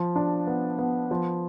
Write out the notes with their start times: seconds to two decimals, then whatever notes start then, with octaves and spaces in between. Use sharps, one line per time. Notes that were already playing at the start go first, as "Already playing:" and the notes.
Already playing: F3
0.16 D4
0.47 B3
0.79 B3
1.11 F3